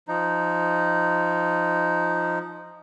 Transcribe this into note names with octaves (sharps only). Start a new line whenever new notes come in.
F3 D#4